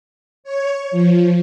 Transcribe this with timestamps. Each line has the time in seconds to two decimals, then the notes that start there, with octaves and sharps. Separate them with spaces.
0.44 C#5
0.91 F3